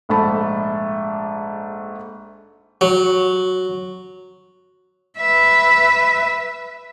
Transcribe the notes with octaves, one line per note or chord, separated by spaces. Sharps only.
A#1 G#2 A3 A5 B5
F#3
B4 E5